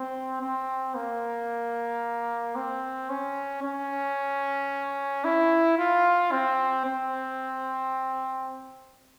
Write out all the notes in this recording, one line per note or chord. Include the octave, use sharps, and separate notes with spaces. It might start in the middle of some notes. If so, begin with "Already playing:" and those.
Already playing: C4
C4
A#3
C4
C#4
C#4
E4
F4
C4
C4